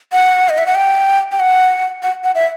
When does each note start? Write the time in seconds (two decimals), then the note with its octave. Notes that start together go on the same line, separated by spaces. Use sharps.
0.12 F#5
0.49 D#5
0.58 E5
0.66 F#5
0.75 G5
1.32 G5
1.40 F#5
2.03 F#5
2.24 F#5
2.35 E5